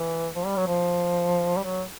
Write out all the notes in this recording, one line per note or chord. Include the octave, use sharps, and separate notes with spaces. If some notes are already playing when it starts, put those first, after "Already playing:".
Already playing: E3
F3
G3
F#3
F3
G3
F#3